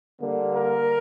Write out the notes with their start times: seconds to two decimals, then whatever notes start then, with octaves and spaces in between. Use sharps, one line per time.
0.20 D3 G3 A#3
0.56 A#4